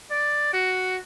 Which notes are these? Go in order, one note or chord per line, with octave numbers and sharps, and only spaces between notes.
D5
F#4